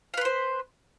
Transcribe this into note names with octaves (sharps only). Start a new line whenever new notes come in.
B4 C5 F5 C6